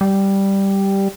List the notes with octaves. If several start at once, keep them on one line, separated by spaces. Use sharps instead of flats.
G3